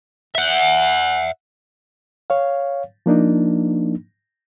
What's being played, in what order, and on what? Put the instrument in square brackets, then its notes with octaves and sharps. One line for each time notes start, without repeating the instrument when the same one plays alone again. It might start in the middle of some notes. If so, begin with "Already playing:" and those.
[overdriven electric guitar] E5 F#5
[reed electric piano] C#5 F5
F3 A#3 D4 D#4